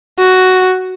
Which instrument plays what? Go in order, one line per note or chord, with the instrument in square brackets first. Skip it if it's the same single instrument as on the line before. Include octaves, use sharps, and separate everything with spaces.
[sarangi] F#4